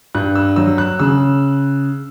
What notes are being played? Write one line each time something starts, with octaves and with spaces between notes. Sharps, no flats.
G2 F#6
E6
F#3 E6
F#6
C#3 E6